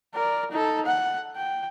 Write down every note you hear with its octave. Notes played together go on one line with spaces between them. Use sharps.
A#4 D5
D#4 A4
F#5
G5